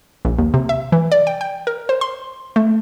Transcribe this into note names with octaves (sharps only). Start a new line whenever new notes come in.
A#1
D#2
C3
E5
E3
D5
G5
G5
A#4
C5
C6
A3